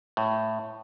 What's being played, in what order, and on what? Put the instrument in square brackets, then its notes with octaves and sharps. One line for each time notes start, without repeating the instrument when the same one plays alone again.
[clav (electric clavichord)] A2